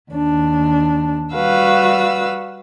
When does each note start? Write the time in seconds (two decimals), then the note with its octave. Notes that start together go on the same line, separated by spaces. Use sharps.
0.11 D#2 D4
1.34 G3 F#4 B4 F5 E6